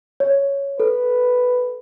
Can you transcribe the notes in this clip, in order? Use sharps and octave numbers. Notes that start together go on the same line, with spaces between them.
C#5
A4 B4